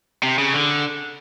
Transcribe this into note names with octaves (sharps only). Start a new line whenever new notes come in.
C3
C#3
D3